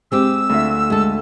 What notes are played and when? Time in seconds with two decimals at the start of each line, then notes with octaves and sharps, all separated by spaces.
0.12 G#3 C4 G4 E6
0.49 D2 F4 E5
0.90 G#3 A4